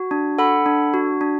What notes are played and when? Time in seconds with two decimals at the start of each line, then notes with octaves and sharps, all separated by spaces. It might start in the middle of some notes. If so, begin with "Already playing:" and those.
Already playing: F#4
0.11 D4
0.38 A4 F#5 B5
0.66 D4
0.94 F#4
1.21 D4